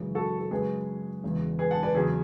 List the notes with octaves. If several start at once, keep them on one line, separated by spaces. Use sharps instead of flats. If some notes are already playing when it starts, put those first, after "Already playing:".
Already playing: G#1 F#2 C#3 E3
F#4 A4
A4
F#2 C#3 G#3 G#4 B4
E1 E2 C#3 E3
G#4 B4
F#5 A5
B4 D5
E2 C#3 F#3 G#4